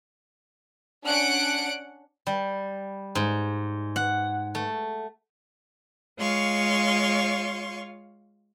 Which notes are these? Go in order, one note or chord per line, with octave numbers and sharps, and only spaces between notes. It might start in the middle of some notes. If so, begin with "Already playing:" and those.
C#4 D4 F#5 F#6 D7
G3
G#2
F#5
A3
G#3 F4 C#5 F5 C6 C#6